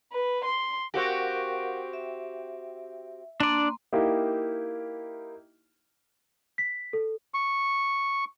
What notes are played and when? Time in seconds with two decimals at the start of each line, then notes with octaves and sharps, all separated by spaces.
0.12 B4
0.45 C6
0.94 C4 F#4 G4 A#4 F5 F#5
1.93 E5
3.40 A#3 D4 D5 C6
3.93 A#3 D#4 E4 G4 F5 G5
6.58 B6
6.93 A4
7.34 C#6